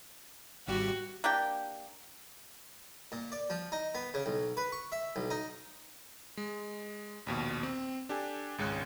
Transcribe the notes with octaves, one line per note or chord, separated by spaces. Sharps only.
G#1 G3 F#4 G4
A#3 D4 G4 G5
A#2
D5
F3
D#4
B3
C#3
B1
B4
C#6
E5
B1
D#4
G#3
A#1 D#2 B2
C4
D4 G4 A4 G#5
G#1 C#2 G#3 C#4 F#6